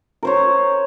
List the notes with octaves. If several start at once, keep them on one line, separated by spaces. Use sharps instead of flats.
A#4 C5 C#5